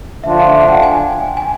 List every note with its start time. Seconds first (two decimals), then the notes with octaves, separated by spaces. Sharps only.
0.23 D3 F3 A3 D4 F4 E5
0.38 F5
0.61 F#5
0.68 G5
0.83 G#5
1.37 G#5